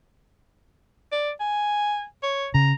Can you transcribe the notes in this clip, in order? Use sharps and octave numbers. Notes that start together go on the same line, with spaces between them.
D5
G#5
C#5
C#3 A#5